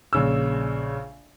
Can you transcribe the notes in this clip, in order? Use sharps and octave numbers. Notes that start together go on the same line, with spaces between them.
A#1 C#3 E6